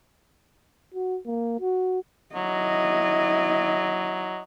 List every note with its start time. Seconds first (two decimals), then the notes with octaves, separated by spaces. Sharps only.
0.94 F#4
1.26 A#3
1.61 F#4
2.35 F#3 E4 D#5